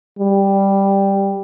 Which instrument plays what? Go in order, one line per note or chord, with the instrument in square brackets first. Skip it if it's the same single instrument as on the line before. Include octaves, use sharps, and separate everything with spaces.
[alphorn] G3